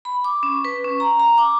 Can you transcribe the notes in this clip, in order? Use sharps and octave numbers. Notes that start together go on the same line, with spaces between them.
B5
D6
C#4
B4
C#4
A#5
A#5
D6